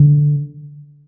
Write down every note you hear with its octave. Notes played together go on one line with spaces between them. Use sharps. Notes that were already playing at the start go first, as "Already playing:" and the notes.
Already playing: D3